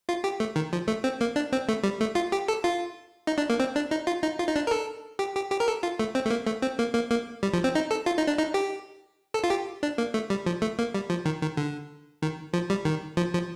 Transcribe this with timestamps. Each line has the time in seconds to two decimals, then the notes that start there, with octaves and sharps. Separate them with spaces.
0.09 F4
0.24 G4
0.40 A3
0.56 D#3
0.73 F3
0.88 A3
1.04 C4
1.21 A#3
1.36 D4
1.52 C4
1.69 A3
1.83 G3
2.01 A3
2.15 F4
2.32 G4
2.48 A4
2.64 F4
3.27 D#4
3.38 D4
3.50 A#3
3.60 C4
3.76 D4
3.91 D#4
4.07 F4
4.23 D#4
4.39 F4
4.48 D#4
4.56 D4
4.67 A#4
4.71 A4
5.19 G4
5.35 G4
5.52 G4
5.60 A#4
5.68 A4
5.83 F4
5.99 A3
6.15 C4
6.26 A3
6.30 A#3
6.47 A3
6.62 C4
6.79 A#3
6.94 A#3
7.11 A#3
7.43 G3
7.54 F3
7.64 C4
7.75 D#4
7.91 A4
8.06 F4
8.18 D#4
8.27 D4
8.38 D#4
8.54 G4
9.34 A4
9.44 F4
9.50 G4
9.83 D4
9.98 A#3
10.14 A3
10.30 G3
10.46 F3
10.62 A3
10.79 A#3
10.94 G3
11.10 F3
11.25 D#3
11.41 D#3
11.57 D3
12.22 D#3
12.53 F3
12.70 G3
12.85 D#3
13.17 F3
13.33 F3